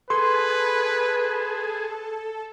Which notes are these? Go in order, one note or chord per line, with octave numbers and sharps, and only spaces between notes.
G#4 A4 B4 C6